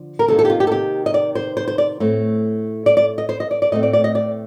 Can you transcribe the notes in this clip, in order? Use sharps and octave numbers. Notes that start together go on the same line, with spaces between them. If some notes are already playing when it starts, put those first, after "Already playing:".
Already playing: D3 F3
A#4
C3 D#3 A#3 A4
A4
G4
F4
G4
A4
G4
D#5
D5
C5
C5
C5
D5
A2 A3 C4
D5
D5
D#5
C5
D#5
D5
D5
A2 A3 C4 D#5
D5
D5
D#5
D5